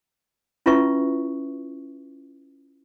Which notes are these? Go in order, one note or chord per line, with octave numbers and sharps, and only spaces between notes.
C#4 E4 F4 B4 E5 C#6